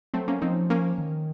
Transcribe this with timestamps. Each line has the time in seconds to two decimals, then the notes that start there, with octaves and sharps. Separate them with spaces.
0.14 F#3 A3 C4
0.28 A#3 C#4
0.42 F3 C4 D#4
0.70 A#3 C#4
0.98 D#3